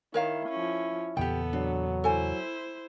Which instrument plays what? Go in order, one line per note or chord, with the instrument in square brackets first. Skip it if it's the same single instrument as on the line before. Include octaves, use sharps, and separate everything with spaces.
[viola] D#3 [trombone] E4 [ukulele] A#4 C#5 F5
[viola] F3 C#4
[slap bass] E2 A#2 C#3 [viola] B3 A4 [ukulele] G4 G5
[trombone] F#3 [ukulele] D4
[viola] E4 C5 [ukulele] A4 G#5